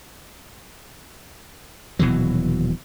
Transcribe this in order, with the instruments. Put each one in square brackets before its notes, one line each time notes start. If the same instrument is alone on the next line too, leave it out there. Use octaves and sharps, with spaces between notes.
[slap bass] D#1 B2 E3 F#3